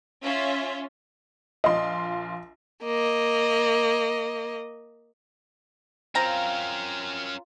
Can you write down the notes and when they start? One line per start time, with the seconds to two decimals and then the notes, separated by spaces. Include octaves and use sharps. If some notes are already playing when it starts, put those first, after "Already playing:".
0.23 C#4 F4 E5
1.64 A#1 F4 D#5 C6
2.84 A#3 D#5
6.15 C4 C#4 F4 A#4 A#5